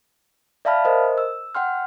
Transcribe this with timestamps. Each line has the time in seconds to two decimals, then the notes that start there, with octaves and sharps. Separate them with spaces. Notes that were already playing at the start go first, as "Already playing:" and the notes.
0.65 D5 E5 F5 A5 B5 F6
0.85 A#4 C5 D#5
1.18 E6
1.55 F#5 G5 C6 F6